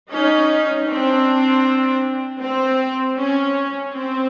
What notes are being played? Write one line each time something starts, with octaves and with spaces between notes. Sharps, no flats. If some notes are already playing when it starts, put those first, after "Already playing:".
C#4 D#4
C4 D4
C4
C#4
C4